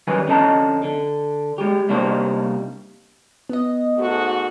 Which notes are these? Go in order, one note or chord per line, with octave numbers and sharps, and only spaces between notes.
F#2 D#3 G3 B4 G#5
F2 D3 C#4 D#5 A5 A#5
D3
G#3 G4
C3 G3 A#3 D4 D#4 C5
B3 D#5
G#2 A3 F#4